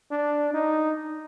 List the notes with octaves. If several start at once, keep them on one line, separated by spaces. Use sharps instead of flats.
D4
D#4